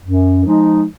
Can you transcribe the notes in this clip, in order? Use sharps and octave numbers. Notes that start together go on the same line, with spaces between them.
F#2
F3 G#3 D#4